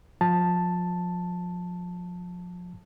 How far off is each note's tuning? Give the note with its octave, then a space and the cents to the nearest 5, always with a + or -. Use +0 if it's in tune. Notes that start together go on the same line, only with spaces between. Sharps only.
F3 +30 A5 +0